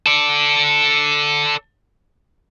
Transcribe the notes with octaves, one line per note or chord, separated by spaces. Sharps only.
A4 D5